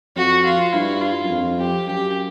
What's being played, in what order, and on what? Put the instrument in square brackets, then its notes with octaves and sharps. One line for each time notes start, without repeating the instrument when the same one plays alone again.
[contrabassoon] F2 [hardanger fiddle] F#4
[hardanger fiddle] F4
[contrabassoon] G2 [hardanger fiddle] E4
[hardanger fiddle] F4
[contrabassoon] F#2
F2
[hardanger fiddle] G4
[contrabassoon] F#2 [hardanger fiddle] G4